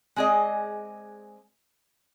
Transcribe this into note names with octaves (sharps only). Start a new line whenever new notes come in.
G#3 C4 G#4 D5 D#5